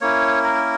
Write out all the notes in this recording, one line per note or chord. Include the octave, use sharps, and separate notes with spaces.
A#3 C#4 E4 C#5
A#4